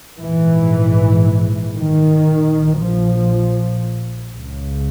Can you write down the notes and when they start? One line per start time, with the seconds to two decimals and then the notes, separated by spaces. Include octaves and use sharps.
0.20 A#1 G#2 E3
1.75 D#3
2.27 A#1 A#2
2.78 F3
4.33 C#2 C#3